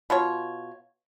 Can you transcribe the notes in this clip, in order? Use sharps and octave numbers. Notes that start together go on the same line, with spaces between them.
B2 F4 C#5